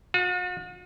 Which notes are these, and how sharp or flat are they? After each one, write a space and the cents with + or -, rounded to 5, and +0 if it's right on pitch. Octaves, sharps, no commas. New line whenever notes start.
F#4 -45